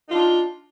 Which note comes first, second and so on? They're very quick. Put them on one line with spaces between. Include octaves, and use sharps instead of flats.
D#4 F4 D4